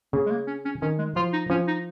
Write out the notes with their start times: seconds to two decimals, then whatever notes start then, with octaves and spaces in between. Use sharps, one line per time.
0.13 C#3 A#3
0.26 G#3
0.31 A#3
0.47 C#4
0.65 C#4
0.81 D#3 C#4
0.98 G#3
1.16 F3 F4
1.33 D#4
1.50 F3 C#4
1.67 D#4